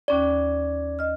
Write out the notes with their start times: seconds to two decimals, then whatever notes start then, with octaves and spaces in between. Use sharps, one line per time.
0.08 D#2 C#4 D5 D6
0.99 D#5 F6